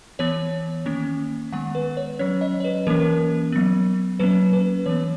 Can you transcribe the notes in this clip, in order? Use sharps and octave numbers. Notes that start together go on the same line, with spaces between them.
E3 B3 C#5
D#3 A#3 C#4
D#3 G#3 B3 F#5
B4
C#5
F#3 C#4 C#5
D#5
C#5
B4
E3 A#3 C#4 A#4
F#3 B3
F#3 A#3 C#4 B4
B4
E3 B3 C#5